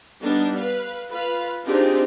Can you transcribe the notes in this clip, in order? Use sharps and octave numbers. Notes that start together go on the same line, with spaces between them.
G3 B3 D4 D#4
B4 F5
F4 B4 F5 B5
C4 D4 D#4 F4 G4 G#4